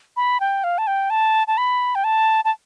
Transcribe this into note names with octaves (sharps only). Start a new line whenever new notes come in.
B5
G5
F5
A5
G5
A5
A5
B5
G5
A5
A5